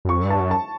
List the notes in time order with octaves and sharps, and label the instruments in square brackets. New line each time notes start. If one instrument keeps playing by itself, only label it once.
[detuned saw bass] F#2
[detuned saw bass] F2 [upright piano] C#6
[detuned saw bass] F#2
G2
[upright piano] A5
[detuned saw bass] F#2
[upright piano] A5